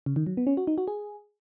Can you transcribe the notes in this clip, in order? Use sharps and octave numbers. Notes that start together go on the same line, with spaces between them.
C#3
D#3
F#3
B3
C#4
F#4
D#4
F#4
G#4